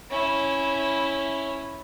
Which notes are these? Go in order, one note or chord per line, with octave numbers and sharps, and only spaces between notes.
C#4 E4